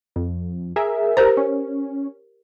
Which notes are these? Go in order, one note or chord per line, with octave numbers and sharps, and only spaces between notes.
F2
G#4 A#4 E5
G4 A#4 C5 A#5
C#4